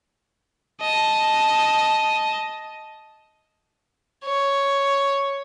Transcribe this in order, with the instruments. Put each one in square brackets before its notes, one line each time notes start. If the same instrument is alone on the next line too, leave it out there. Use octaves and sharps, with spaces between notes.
[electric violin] D#5 A5
[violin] C#5